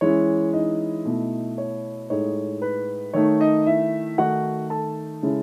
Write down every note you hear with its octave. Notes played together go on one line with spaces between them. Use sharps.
E3 G#3 C#4 E4 C#5
D#4 D#5
B2 A3 E4
C#5
A2 G#3 D#4 C#5
B4
D#3 A3 D#4 C#5
D#4 D#5
E4 E5
D#3 A3 D#4 F#4 F#5
A4 A5
C#3 G#3 C#4 E4